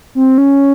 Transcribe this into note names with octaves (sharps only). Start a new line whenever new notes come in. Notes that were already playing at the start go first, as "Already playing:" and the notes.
C4
C#4